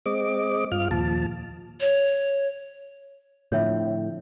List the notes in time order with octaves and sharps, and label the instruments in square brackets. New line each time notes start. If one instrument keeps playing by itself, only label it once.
[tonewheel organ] G#3 C4 D#5 D6
G2 F4 F6
D#2 A#2 F3 A5
[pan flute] C#5
[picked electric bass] A2 [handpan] D3 F3 C4 [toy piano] C#5 E5